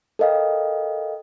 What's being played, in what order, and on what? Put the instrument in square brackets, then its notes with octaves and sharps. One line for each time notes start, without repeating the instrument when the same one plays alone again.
[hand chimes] A4 A#4 D#5 F5 G5